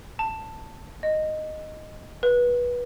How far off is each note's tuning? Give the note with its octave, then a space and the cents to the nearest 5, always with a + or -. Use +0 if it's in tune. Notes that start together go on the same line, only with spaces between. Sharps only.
A5 +10
D#5 -5
B4 -20